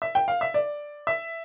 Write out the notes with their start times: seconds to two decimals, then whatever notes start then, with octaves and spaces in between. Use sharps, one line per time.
0.02 E5
0.15 G5
0.28 F5
0.41 E5
0.54 D5
1.07 E5